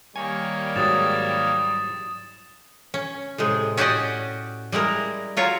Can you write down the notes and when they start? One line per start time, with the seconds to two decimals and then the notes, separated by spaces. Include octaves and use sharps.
0.16 D#3 G3 A#3 C#5 G#5
0.76 G#2 F#3 G#3 D#6 A6 E7
2.94 C#4
3.38 A2 C3 G#3
3.77 C#4 F#4 G4 D5 D#5
4.72 G3 G#3 E4 A#4
5.37 F#3 F4 C#5 A#5